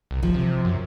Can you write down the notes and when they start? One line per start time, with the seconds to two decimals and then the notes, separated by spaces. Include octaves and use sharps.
0.11 C2
0.23 F#1 F3
0.34 C3
0.65 F#2